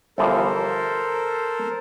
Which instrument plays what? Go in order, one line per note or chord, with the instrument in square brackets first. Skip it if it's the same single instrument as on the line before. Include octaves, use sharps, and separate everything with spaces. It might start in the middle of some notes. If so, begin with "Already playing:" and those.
[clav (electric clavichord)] G1 E3 F3 [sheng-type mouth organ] A4 A#4 C5